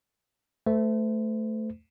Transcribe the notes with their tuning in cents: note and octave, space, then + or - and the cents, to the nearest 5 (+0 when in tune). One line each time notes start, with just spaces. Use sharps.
A3 +0 C5 -40